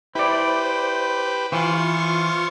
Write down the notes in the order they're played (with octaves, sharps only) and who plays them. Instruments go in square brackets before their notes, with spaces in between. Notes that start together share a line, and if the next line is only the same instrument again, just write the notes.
[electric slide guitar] E4 D5 [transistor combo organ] G4 B4 [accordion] C5
[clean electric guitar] E3 [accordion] F4 F5 C#6 [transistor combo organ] C5